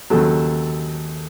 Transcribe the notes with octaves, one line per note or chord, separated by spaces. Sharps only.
D#2 C#3 F#3 A4